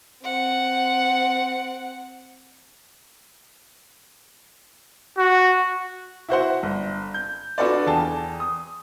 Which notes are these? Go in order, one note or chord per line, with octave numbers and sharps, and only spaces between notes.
C4 F#5
F#4
E4 F#4 C5 F#5
G1
G6
D4 F4 F#4 A4 B4 D5
E2 G#4 G5 A5
D#6